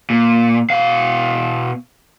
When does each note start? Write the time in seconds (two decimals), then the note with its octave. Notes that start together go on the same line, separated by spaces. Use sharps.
0.10 A#2
0.70 B2 F5